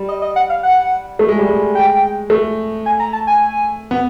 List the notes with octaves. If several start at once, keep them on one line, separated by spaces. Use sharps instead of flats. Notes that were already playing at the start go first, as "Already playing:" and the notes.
Already playing: G3
D#5
D#5
F#5
F5
F#5
A3
G#3
G3
G#3
G5
A3
G#5
A#5
A5
G#5
B3